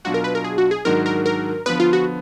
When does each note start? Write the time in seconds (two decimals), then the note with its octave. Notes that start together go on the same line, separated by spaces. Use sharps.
0.05 B2 F#3 D4 F4 F#4
0.14 A#4
0.24 B4
0.35 A#4
0.44 G#4
0.58 F#4
0.71 G#4
0.85 G#2 D#3 F#3 D4 F#4 A#4
1.06 A#4
1.26 A#4
1.66 D3 F3 B3 B4
1.80 F4
1.93 F#4